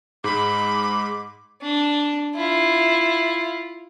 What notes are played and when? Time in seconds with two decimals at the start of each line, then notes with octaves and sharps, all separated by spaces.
0.24 G#2 G#3 B5 D6
1.62 D4
2.35 E4 F4